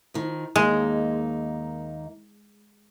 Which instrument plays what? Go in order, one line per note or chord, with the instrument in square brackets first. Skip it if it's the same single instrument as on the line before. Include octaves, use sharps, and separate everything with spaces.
[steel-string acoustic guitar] D#3 F3
[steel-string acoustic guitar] D#2 A#3 D#4 [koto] G#3